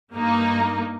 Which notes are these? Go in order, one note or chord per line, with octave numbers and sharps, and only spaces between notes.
G2 A#3 D#4